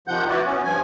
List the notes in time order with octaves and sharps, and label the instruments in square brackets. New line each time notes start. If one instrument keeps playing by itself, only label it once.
[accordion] C3 D#3 F3 F#5 G6
E4 F#4 B4 D5
B3 C#4
G2 F3 G#5